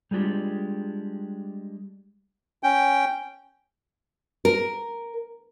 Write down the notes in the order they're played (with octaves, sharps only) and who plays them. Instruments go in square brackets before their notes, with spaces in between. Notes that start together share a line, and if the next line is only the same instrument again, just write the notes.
[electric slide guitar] G3 G#3 D4 F4 G4
[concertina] C#4 G5
[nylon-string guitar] A#4